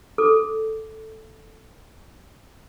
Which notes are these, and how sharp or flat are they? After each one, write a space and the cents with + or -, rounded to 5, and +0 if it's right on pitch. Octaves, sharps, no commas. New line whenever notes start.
A4 +0 D6 +0